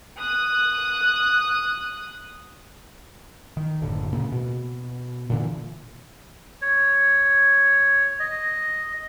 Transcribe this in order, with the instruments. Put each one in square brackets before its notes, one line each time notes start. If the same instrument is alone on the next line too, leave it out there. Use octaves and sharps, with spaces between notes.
[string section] D#6 F#6
[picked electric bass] D#3
F#1 D#2 A2 D3
A#2 C#3 A#3
B2
A#2 D3 E3
[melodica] C#5
D#5